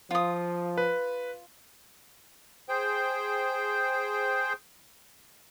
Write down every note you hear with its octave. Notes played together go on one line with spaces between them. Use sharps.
F3 F4 D#6
B4
G#4 C5 G5 G6